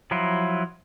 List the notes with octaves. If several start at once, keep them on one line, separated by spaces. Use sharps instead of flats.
F3 F#3 E4 F4